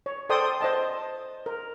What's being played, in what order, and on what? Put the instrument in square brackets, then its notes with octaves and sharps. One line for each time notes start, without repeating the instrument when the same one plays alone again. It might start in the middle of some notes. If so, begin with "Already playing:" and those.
[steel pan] C#5
A4 C5 D5 G5 C6 D#6
C5 D#5 A5
A#4